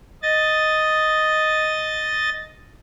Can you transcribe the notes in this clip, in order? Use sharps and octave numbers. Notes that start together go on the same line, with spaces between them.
D#5 A6